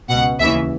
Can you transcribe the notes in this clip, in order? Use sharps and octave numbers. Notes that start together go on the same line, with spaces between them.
C#2 B2 F#5
D#2 C#3 E3 E5